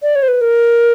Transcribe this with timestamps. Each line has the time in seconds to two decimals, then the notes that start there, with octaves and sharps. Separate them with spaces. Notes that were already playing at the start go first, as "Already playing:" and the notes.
0.03 D5
0.16 C#5
0.23 C5
0.28 B4
0.41 A#4